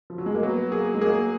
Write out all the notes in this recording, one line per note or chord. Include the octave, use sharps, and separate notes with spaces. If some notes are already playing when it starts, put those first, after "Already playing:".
F3
F#3
G#3
A#3
F#3 B3
A#3 G#4
G#3
A#3 G#4